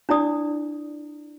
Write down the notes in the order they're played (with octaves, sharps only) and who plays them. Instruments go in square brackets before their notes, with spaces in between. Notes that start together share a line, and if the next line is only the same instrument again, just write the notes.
[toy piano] D4 E4 D5 D#6